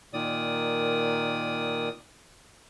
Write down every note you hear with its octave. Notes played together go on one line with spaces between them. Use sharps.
A#2 D#3 D5 D#6